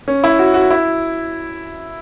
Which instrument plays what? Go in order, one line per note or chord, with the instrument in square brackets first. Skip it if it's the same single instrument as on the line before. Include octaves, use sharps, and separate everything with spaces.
[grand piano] C#4
E4
F#4
F#4
E4